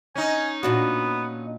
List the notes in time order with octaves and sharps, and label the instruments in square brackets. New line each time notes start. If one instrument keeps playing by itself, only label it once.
[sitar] C#4 D#4 [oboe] G#5
[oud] A#2 D4 F#4 [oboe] B3